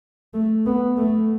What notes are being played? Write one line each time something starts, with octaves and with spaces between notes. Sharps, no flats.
A3
B3
A3